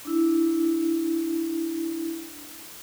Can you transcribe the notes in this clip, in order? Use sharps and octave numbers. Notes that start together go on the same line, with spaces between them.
D4 E4